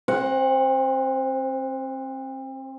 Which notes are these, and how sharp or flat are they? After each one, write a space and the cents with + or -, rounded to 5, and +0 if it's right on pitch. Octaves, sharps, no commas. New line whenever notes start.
C4 +35 C5 +0 F#5 +0